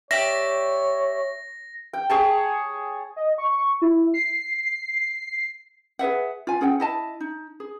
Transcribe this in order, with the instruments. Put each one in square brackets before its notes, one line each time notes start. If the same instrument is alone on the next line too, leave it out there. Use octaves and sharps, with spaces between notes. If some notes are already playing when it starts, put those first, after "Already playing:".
[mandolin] G4 D5 E5 [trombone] C#5 [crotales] A#6
[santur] G5
G#4 C#5 A5
[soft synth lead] D#5
C#6
E4
C7
[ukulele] G#4 B4 E5 F#5
F4 G#5
C#4 G#4 F#5 G5
E4 D#5 A5
D#4
G#4